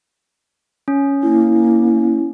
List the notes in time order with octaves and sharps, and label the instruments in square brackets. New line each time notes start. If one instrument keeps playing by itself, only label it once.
[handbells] C#4
[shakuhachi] A#3 [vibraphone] E4